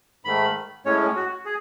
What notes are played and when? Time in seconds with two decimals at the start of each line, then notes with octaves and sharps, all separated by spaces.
0.25 G#2 D#3 A3 B5
0.85 A2 G#3 C#4 C#5
1.16 F#4
1.45 G#4